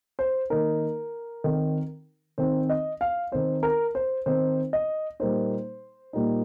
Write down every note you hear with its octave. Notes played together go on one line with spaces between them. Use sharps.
C5
D#3 A#3 D#4 A#4
D#3 C4 D#4
D#3 C4 D#4 C5
D#5
F5
D#3 C4 D#4 C5
A#4
C5
D#3 C4 D#4 C5
D#5
A#2 G3 A#3 D#4 C5
A#2 G3 A#3 D#4